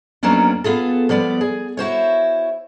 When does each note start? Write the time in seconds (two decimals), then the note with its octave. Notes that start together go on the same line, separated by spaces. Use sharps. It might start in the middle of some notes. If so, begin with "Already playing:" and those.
0.23 F2 F#3 A#3 B3 C#4 D4
0.64 B3 F4 G#4 A4
1.09 F3 G3 B3 D5
1.41 G#4
1.77 E4 F#4 C5 C#5